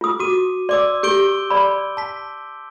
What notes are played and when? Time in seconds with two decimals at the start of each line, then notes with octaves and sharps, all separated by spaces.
0.01 F4 D#6
0.20 F#4 D6 D#7
0.69 D5 C6 D6 E6
1.03 G4 G6 D7 G7
1.50 D5 B5
1.97 A5 B6